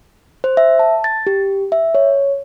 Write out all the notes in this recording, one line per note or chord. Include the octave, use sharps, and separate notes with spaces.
C5
E5
A5
A6
G4
E5
C#5